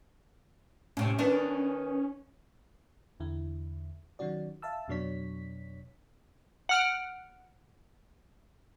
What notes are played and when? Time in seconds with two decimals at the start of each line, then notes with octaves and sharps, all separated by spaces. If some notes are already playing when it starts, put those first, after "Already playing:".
0.97 A2 C3 C#4
1.19 D#3 B3 D4
3.20 E2 D3 E4
4.19 D#3 F#3 C#4 F#4 D5
4.62 E5 F5 A5 E6
4.88 F2 B2 F#3 D4 C#5 B6
6.69 F#5 F6 D7